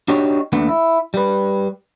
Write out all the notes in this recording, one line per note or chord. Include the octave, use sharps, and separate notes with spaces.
D4 D#4 F#4 G4 C#5
D#2 A3 B3 D4 F#5
E4
G3 B4